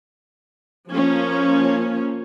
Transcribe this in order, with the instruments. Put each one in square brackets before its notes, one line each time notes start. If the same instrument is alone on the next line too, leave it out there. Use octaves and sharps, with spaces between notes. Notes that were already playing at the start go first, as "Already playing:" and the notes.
[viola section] F3 A#3 C#4